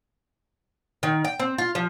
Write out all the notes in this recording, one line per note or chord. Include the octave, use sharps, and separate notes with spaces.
D#3
G5
C4
F4
F3